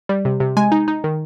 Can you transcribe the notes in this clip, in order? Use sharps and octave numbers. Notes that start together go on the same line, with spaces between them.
G3
C3
C3
G#3 G#5
D#4
D#4
D#3